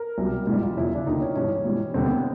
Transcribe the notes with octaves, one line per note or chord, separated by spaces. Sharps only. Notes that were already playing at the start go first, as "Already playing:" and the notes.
Already playing: A#4
C2 B2 G3
G#2 E3 G3
F4
E2 C#3 F3 E4
D4
D#2 D3 F3 D#4
C#4
G2 E3 G3 C#4
G#2 E3 G3
D#2 D3 G3 C4
B3